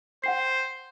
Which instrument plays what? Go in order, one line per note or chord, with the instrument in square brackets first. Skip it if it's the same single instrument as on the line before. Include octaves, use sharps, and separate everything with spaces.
[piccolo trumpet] C5 [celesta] F#5 G5 C7